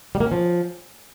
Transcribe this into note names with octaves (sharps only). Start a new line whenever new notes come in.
G3
A#3
C#4
F3